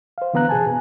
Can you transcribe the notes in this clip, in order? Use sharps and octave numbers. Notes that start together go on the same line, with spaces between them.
C5 F5
D3 E3 B3 F5 A#5 F#6
B2 G#4 G#5 A5
B2